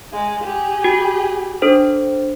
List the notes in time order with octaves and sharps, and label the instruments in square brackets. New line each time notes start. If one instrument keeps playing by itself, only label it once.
[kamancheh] G#3
G4 G#4
[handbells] F#4
D4 A4 C5